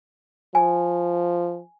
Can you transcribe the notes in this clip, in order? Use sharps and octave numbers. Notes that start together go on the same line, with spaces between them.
F3 G#5